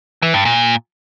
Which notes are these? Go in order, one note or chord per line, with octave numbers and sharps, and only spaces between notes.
E3
G2
A#2